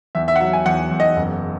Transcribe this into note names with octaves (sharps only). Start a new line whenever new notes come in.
E2 E5
E5
F#5
F#3 E5
G#5
E2 F#5
E2
D#5
F#1